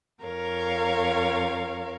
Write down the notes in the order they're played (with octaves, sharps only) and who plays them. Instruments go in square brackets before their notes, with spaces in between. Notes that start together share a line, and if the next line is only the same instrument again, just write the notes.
[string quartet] F2 A#4 C#5 F5